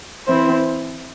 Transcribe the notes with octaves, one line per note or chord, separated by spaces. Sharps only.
E3 C4 E4 C5